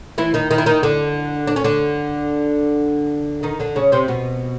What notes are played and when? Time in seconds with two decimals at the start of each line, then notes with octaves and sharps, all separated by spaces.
0.18 E3 E4
0.34 D#3 D#4
0.51 D#3 D#4
0.58 E4
0.66 D#3 D#4
0.83 D3 D4
1.47 D4
1.56 C#4
1.64 D3 D4
3.43 D#3 D#4
3.60 D3 D4
3.76 C#3 C#4
3.92 C3 C4
4.08 B2 B3